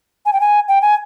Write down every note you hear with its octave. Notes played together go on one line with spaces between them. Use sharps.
G#5
G5
G#5
G5
G#5